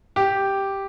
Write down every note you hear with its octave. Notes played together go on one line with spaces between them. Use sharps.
G4